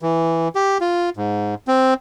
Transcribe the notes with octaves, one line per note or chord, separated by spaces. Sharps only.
E3
G4
F4
G#2
C4